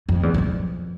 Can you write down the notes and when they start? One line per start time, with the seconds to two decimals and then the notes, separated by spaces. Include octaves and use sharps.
0.09 F2
0.23 E2
0.34 E2
0.38 F2